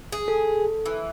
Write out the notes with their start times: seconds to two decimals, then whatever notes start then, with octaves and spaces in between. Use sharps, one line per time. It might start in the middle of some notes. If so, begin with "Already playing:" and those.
0.12 G#4
0.28 A4
0.86 E3